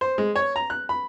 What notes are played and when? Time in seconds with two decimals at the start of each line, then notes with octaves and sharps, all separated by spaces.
0.01 C5
0.18 G#3
0.36 C#5
0.56 A#5
0.70 F#6
0.89 B5